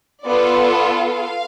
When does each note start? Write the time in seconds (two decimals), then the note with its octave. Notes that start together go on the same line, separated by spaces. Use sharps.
0.25 B3 F4 A4 D5
0.95 F5